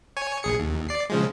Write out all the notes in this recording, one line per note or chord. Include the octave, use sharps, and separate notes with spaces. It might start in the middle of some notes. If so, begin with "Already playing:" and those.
C#5 G#5
A#1 G#4 C#7
D#2
D5 C7
C#3 F3 G#3